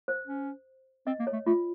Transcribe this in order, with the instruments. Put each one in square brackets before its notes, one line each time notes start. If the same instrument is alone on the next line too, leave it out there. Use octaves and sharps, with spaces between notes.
[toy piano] C5
[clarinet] C#4
[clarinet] C4 [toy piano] D#5
[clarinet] A#3
[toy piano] C#5
[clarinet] A3
[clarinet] A3 [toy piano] F4